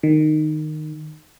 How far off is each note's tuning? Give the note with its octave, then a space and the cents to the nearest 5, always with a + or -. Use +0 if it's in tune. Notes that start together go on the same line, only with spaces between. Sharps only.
D#3 -15